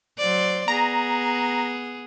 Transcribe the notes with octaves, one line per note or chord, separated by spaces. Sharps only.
F#3 C5 D5
B3 G#4 A#5